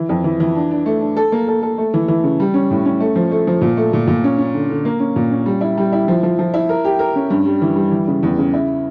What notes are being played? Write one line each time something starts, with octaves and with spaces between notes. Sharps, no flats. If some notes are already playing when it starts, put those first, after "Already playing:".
Already playing: E3
F2
E3
E3
D4
D4
A3
D4
A4
A#3
A4
A4
A3
E3
E3
C#3
G3
C#4
A2
C#4
A3
F3
A3
F3
A#2
A3
A#2
A#2
C#4
C#4
D3
D3
A#3
C#4
A#2
C#4
G3
E4
G3
E4
F3
F3
F3
E4
A#4
G4
A#4
C#4
G2
G3
E3
G3
E3
C#3
E2
C#3
E4